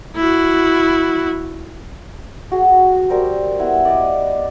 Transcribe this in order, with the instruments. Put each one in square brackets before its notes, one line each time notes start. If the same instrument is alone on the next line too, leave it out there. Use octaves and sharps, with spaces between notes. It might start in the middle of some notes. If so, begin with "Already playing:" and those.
[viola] E4 F#4
[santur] F#4 G#4
G3 A#4 C5 E6
B3 E4 E6
D5 D#5